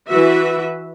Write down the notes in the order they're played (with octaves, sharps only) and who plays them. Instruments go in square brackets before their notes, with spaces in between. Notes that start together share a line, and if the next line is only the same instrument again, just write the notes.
[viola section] E3 F#4 B4 E5